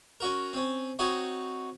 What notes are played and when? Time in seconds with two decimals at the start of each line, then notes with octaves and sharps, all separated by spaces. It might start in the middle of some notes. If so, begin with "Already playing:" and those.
0.20 C#4 F#4 A#4
0.53 C4 C#4
0.99 C4 D#4 F#4 C#5